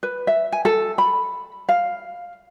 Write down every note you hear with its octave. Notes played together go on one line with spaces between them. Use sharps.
B4
E5
G#5
A4
B5
F5